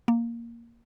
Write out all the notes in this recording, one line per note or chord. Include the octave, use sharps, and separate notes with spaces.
A#3